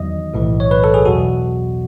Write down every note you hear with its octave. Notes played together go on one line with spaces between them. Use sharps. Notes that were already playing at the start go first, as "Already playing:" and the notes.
Already playing: E2 D#3 F#3 D#5
B1 A2 E3
C#5
B4
A4
G#4
E2 B2 F#3 F#4